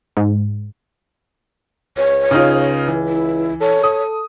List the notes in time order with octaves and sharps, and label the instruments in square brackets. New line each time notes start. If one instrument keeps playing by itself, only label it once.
[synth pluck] G#2
[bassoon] C#2 [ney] C#5
[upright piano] C#3 D#4 F4
E3
[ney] E4
[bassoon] A4 [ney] C#5
[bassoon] A4 [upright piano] D#6